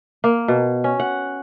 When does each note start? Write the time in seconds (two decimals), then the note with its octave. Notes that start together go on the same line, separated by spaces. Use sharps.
0.24 A#3
0.48 B2
0.84 C#4
1.00 F#5